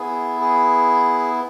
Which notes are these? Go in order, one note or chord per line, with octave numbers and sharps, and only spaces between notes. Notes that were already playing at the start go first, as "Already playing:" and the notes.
Already playing: B3 E4 G#4
G#4